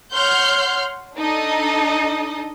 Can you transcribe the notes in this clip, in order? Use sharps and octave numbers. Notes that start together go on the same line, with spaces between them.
C#5 F#5 C6 F6 G6
D4 D#4 A4 D#5